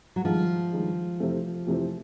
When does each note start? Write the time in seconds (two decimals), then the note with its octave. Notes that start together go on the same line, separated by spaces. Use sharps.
0.16 F#3
0.25 G2 D#3 F3 G#3
0.72 G2 D#3 G#3
1.20 F2 C3 E3 A3 C4
1.67 F2 C3 E3 A3 C4